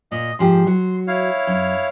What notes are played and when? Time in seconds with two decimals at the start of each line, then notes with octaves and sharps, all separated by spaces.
0.12 A#2 D#5
0.39 G#2 F3 G4 C6
0.67 F#3
1.07 E4 C#5 F5
1.47 F#2